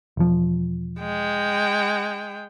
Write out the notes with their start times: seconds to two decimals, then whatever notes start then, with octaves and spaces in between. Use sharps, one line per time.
0.17 E1 F3
1.00 G#3 G5